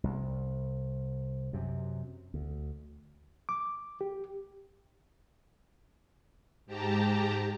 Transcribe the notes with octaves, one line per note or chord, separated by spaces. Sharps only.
C2
F#2 C3
D2
D6
G4
G#2 G4 A5 A#5